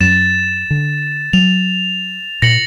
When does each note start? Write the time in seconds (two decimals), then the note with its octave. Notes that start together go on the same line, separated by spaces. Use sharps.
0.01 F#2 A6 E7
0.70 D3
1.33 F#3 F7
2.42 A#2 A#6 C#7 F#7